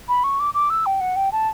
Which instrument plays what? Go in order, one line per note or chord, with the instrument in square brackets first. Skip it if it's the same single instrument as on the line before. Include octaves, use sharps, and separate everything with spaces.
[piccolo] B5
C#6
D6
D6
E6
G5
F#5
G5
A5